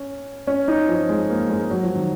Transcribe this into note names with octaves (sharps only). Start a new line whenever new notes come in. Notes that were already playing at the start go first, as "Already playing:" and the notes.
Already playing: C#4
C#4
D#4
F3
G#3
A#3
G#3
F#3
F3
D#3